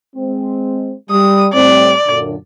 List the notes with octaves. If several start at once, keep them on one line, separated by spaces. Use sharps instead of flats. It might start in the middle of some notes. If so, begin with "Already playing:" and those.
G#3 C4
G3 D#6
A2 G3 C4 D5
F#2 A#2 D3